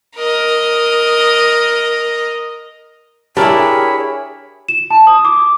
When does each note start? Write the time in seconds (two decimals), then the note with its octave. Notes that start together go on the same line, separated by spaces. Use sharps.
0.16 A#4 D#5
3.37 D4 E4 G4 G#4 A#4 C#5 B5
4.69 E7
4.90 A5
5.07 D#6
5.25 D6